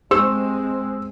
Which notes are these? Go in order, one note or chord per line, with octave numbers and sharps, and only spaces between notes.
G#3 C4 G4 C5 E6